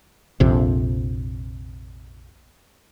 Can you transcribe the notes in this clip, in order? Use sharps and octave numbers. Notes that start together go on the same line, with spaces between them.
A#1 F2 C3